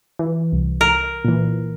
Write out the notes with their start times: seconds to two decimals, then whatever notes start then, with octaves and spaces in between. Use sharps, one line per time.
0.19 E3
0.53 C2
0.81 A#4
1.25 A#2 E3